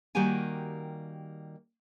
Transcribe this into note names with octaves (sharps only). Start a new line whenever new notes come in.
D#3 G3 A#3 F#4 G4 G#5